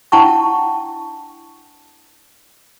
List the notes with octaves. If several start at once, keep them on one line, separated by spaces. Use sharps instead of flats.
D4 E4 F#5 G5 A5 C#6